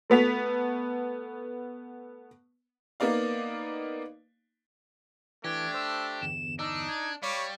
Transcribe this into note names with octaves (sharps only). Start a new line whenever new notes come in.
A3 B3 B6 F7
A#3 B3 D#4 D5 F5
E3 A3 D4 G4 G#6
C5 E6
G1 E2 E7
D4 D#4 E6
G#6
G3 C#5 F5 B5 C#6 D6